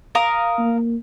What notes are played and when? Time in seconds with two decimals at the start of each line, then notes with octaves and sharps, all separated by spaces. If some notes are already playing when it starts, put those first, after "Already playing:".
0.15 A#4 F5 D#6
0.59 A#3